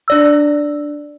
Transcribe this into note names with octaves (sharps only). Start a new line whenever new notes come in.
D4 D5 E6